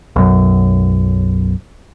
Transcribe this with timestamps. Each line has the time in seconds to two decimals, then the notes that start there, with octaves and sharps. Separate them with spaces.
0.16 B1 F#2